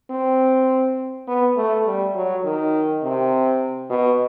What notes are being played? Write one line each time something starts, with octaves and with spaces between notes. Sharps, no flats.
C4
B3
A3
G3
F#3
D#3
C3
B2